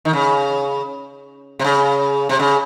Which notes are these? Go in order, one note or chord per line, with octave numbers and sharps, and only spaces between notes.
D#3
C#3
C3
C#3
C3
C#3